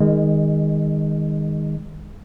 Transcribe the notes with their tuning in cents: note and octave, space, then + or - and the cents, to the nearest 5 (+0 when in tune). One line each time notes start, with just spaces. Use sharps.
D#3 +0 G#3 -30 D#5 +0